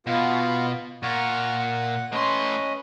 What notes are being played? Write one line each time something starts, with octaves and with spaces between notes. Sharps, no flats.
B2 B3 F4
A#2 F#5 C#6 F6
F#5
A2 C#4 B4 D#5 C6